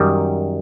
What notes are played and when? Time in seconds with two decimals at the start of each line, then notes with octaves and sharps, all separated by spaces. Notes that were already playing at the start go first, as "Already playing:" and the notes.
Already playing: F#2 D#3 G3